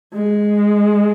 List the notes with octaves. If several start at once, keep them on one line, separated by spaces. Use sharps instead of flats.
G#3